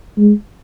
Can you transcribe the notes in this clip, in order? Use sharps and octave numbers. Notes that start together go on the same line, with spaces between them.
G#3